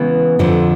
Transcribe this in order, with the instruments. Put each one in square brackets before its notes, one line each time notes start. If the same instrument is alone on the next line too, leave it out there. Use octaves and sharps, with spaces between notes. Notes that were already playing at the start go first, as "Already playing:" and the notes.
Already playing: [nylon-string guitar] C#3 E3 G#3 B3
F2 D3 F3